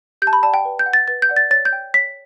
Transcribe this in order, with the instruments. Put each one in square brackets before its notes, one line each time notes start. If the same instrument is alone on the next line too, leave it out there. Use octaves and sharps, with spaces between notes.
[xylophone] G4 G6
A5
B5
D5 A5
F#5
G5
B4
G6
F#5
A6
B4 A6
G6
D5 F#5
A6
C#5 A6
G6
G5
C#5 B6